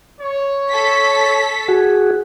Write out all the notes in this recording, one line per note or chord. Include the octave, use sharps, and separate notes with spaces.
C#5
A4 B6
F#4 G#4